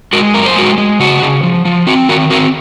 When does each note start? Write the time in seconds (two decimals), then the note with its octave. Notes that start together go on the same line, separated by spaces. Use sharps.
0.13 G#3 F#4 A#4
0.34 F#2 A#4
0.46 C5
0.56 G#3 F#4 A#4
0.78 G#3
0.99 C#3 F#4
1.22 C#3
1.43 F3
1.65 F3
1.87 C4 F#4
2.09 D#3 F#4 A#4
2.30 C4 F#4 A#4